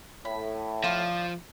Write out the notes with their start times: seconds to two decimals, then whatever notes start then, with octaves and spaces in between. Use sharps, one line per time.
0.25 A2 B5
0.84 F3 F4 D5 F5